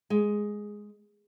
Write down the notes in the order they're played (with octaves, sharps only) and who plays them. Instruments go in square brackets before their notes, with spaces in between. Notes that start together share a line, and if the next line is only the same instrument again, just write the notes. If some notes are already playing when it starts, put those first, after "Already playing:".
[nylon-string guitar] G#3